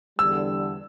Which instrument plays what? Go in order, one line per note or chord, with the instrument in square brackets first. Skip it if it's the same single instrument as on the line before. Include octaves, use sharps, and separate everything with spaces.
[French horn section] E2 D3 G3 [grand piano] E6